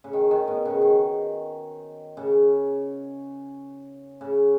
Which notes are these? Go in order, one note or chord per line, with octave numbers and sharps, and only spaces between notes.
C#3
D#3
D#3
B2
C#3
D#3
C#3
C#3